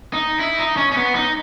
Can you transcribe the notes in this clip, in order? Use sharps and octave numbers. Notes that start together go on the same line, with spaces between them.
D#4
E4
D#4
C#4
C#4
B3
D#4